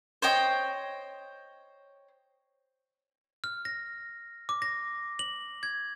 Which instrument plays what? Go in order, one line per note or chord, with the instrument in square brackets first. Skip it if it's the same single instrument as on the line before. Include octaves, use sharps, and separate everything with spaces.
[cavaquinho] C5 C#5 D#5 G5
[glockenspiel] F6
A#6
D6
A#6
F#7
G#6